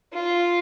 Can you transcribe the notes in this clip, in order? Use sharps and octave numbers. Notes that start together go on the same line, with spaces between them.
F4